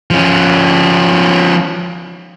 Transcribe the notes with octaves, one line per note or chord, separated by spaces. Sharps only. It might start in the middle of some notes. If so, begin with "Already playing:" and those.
F3 C#4